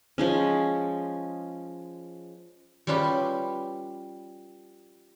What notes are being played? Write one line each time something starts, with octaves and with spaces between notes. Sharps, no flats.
F3 G#3 C#4
G3 C#4 F4 G4 B4 E5